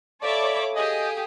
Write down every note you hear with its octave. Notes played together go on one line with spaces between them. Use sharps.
A4 C#5 D5 E5 F5 A5 B5 D6
G4 G#4 D#5 G5 D#6